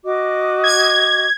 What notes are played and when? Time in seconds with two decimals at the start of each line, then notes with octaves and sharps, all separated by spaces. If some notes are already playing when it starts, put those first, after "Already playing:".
0.04 F#4 D#5 D6
0.64 G#6